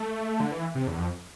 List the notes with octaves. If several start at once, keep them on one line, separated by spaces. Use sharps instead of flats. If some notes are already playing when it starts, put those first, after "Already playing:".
Already playing: A3
D3
E3
C3
E2
F2